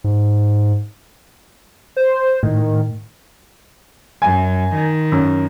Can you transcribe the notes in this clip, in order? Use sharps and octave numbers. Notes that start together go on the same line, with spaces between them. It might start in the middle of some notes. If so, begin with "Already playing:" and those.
G#2
C5
A2 D#3
F#2 G#5
D#3
F#2